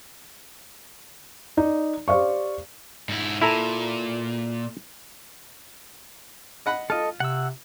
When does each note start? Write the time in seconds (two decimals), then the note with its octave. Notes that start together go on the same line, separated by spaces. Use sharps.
1.57 D#4 D5
2.08 G4 C5 D5 F5 C#6
3.09 G#2 E4
3.42 A#2 E4 A4 A#5
6.66 D#5 F#5 B5
6.90 F4 A4 D#5 F6
7.20 C3 F#5 E6